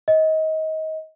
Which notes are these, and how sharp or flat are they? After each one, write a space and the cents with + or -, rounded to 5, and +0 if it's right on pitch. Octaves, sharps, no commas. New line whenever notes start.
D#5 +25